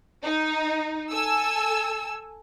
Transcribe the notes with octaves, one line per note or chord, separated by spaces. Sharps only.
D#4
A4 G#5 E6